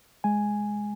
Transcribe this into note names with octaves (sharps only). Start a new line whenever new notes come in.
G#3 G#5